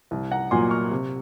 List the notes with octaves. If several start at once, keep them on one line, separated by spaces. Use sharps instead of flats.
C2
F#5 A#5
A#2 F#3 A#3 G#5 C6
C#6 F6
C3